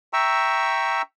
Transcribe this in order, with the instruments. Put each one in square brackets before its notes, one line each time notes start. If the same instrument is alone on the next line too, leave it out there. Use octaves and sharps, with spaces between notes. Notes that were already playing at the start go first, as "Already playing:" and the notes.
[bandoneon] E5 G5 A#5 C#6 E6